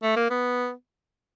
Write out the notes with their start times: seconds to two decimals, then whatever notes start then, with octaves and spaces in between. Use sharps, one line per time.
0.03 A3
0.16 A#3
0.30 B3